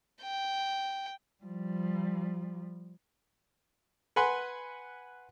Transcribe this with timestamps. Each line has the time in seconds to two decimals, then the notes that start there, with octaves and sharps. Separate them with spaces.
0.22 G5
1.44 F3 G3
4.16 B4 F#5 G#5 B5 C6